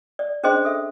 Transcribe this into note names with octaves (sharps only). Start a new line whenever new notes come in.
D5
C#4 D4 G#4 C5 D#5 C6
A4 E5